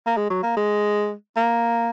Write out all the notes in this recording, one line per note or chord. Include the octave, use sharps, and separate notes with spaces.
A#3
G#3
F#3
A#3
G#3
A#3